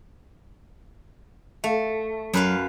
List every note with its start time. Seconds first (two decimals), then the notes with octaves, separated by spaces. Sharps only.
1.64 A3 E5 F5
2.33 F#2 F#3 B4 F5